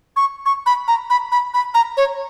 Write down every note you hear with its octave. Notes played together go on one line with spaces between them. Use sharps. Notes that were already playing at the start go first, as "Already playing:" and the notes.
C#6
C#6
B5
A#5
B5
B5
B5
A#5
C#5